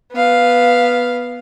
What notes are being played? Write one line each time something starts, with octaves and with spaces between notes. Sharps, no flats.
B3 F5